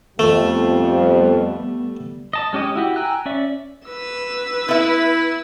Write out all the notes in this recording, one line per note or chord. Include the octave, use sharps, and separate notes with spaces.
F2 G3 A3 B3
D#5 A5
G#3 C#4 G4 D#5
E4 F#4 G4
G5 G#5 A#5 E6 F#6
C#4 D5 E5
B4 E6
B3 E4 E5